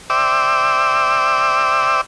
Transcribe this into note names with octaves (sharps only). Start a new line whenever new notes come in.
C5 D5 E5 G5 D6 E6